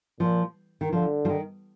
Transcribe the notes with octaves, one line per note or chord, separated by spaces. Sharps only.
A#2 F3
D#3
D3 F3
F3
D#3